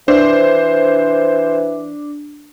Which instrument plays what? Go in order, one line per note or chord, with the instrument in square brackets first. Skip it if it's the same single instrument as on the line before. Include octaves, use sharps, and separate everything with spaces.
[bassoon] E3 [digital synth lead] D4 [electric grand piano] C5